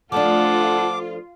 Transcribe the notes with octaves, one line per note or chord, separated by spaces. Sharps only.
F3 A3 D4 F4 A4 F#5 D6